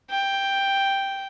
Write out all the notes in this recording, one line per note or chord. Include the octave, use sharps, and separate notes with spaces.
G5